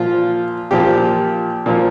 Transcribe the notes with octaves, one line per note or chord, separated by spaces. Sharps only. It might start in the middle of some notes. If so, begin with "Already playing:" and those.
Already playing: A#2 F3 F4
A#2 F3 G4
A#2 F3